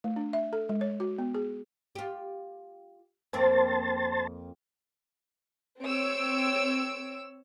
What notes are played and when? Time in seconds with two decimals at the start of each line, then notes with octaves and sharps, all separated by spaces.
0.04 A3
0.16 D4
0.33 E5
0.53 A4
0.69 G#3
0.81 C#5
1.00 F#4
1.18 B3
1.35 G#4
1.95 F4 G4
3.33 F2 A#3 C4 C5 A5
5.81 C4 C#5 E6 D7